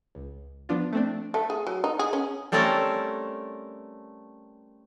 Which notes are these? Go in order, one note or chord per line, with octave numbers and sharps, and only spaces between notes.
C#2
F3 B3 D4 F4
A3 C4 D4
A3
G#4
F#3
D#4
G#4
C#4
G3 A3 C4 C#4 A4 A#4